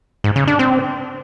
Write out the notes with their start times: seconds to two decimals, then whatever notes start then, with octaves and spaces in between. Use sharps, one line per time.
0.24 G#2
0.36 C#3
0.48 D4
0.59 C4